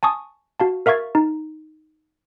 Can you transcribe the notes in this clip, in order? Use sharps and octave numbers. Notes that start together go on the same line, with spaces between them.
G#5 A5 C#6 D#6
F#4 F5 A5
A#4 E5 F5 C#6 G#6 A6
D#4